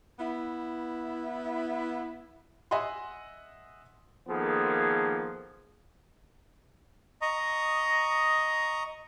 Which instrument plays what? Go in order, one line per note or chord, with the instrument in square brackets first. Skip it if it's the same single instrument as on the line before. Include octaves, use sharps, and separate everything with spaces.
[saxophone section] B3 E4
[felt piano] D#5 E5 F#5 G#5 C6
[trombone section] D#3 F3 A#3 B3 G#4 A4
[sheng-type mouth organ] D#5 A#5 C#6 D#6